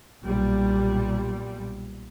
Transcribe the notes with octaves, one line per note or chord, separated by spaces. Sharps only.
B1 A#2 G3